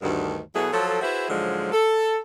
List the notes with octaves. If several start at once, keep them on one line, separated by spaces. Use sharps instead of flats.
D2 G2 D#3
B2 F#3 B3 E4 G#4 A4
F3 F#3 A4
E4 F#4 G#4 B4 C5 E5
G#2 D3 F3 F#3 G#3
A4